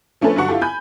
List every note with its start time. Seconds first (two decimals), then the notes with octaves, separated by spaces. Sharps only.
0.21 F3 A3 C#4 D4 A4 B4
0.36 G2 D3 F#3 D4 F#5 C#6
0.48 E4 F4 G4 A4
0.61 G#5 B5 G6